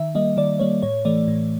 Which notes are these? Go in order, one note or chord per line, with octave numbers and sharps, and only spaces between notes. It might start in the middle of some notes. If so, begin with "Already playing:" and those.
Already playing: D#3 E5
G3 A#3 D#5
D#3 D5
G3 A#3 C#5
A2 C#5
E3 A3 D5
A2